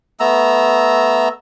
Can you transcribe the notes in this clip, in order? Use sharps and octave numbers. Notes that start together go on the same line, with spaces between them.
A3 B3 A#5 E6